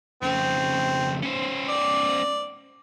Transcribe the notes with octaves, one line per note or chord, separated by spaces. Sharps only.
F2 C#3 C4
C#4 C5
D5